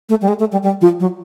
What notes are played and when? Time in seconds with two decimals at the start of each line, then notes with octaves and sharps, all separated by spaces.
0.09 A3
0.22 G3
0.28 G#3
0.40 A3
0.52 G3
0.63 G3
0.81 F3
1.00 F#3